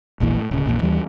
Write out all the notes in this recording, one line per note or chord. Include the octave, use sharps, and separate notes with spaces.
E1 A#1 A#2 E3
A2
D1 C#3
A#1 E2 A#2
D#2 E3 G3